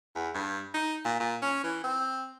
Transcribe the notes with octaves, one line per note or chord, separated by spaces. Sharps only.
E2
G2
D#4
A#2
A#2
C#4
E3
C4